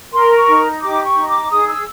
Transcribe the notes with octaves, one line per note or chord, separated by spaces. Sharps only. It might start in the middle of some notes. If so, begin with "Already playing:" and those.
A#4 C6
C#6
D#4
G4 D6
C#6
D#4
D6
G#4 D#6
E6